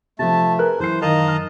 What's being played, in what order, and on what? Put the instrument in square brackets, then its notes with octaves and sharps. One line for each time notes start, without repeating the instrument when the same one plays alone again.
[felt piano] C3 F3 [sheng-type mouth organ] A3 [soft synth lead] A5
[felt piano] G#4 B4 F#6 [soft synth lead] A#4
[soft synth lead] F#2 [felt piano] E3 C7 [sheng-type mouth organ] C5
[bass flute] D#3 [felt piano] A#4 F5 [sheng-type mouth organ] D#5 A5 A#5
[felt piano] F6